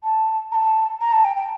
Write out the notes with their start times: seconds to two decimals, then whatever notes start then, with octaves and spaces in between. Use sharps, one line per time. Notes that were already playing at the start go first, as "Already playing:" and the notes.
0.04 A5
0.52 A#5
0.55 A5
1.01 A#5
1.13 A5
1.25 G5
1.37 G5